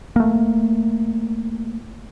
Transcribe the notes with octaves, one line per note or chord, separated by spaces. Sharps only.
A3 A#3